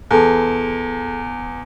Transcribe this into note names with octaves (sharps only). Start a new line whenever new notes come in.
E2 G#4 A4 A5